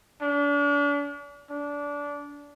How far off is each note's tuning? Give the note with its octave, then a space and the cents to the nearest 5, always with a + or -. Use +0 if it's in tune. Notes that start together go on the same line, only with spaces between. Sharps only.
D4 -40
D4 -20